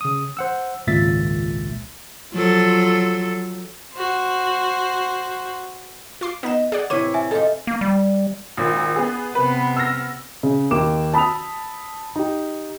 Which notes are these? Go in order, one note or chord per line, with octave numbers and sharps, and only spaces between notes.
C#3 D#6
C5 F#5 E6
G#1 C#2 A#2 E5 A6 B6
F3 F#3 A4
F#4 C5
F4 C6 D6
B3 D#4 D#5 E5 E7
G#4 D5 F#5
A2 C3 E3 E4 C#5 D6 D#7
E5 G#5
D#4 F4 G4 A4
A#3
G3
G#1 A#2
B3 G#4
C3 B3 B4
E6 F6 A#6
C#3
D#2 D6 E7
A5 B5 D#6 E6 F7
D#4 G4